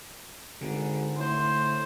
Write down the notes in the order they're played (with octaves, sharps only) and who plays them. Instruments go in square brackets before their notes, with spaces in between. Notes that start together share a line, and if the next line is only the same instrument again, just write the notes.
[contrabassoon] G#1 [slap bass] D3
[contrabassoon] A2 [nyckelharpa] C5